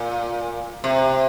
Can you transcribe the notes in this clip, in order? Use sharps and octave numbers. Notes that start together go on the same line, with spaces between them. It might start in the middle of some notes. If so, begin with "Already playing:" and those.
Already playing: A#2
C3